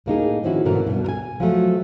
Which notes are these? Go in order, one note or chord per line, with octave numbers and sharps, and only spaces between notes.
A2 A#3 D#4 G#4
D#3 F3 C4 C#4 E4 F#4
G#2 B2 D3 E3 A#4
G2 B2
A#4 G#5
F3 F#3 A3